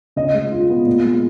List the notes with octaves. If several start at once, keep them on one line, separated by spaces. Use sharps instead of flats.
C#3 D#5
G#3
F4
B3
A#2
G#3